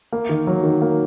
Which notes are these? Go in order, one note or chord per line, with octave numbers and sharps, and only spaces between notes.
A#3
D#3
F#3
D#3
A#3